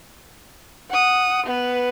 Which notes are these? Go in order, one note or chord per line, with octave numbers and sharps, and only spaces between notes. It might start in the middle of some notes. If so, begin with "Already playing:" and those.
F#5 D#6
B3 B4